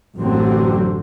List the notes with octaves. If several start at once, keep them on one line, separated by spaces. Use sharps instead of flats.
A1 F#2 D3 F#3 C4